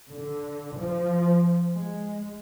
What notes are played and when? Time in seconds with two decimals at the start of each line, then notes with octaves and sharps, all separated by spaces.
0.11 D3
0.77 F3
1.73 G#3